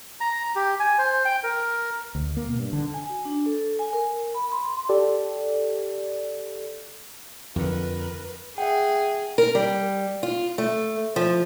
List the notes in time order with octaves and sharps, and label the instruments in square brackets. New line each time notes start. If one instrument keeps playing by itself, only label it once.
[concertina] A#5
G4
G#5
C5
G5
A#4
[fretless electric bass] D2
A#3
B2
G2
D3
[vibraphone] G#5
F#4
D4
A4
G#5
A#4
B5
C6
[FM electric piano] G4 A4 D5
[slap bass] F2 D3 [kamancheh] A#4 B4
[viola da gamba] G#4 [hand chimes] E5 F#5 G5
[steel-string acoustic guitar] A#4
G3
F4
A3
F3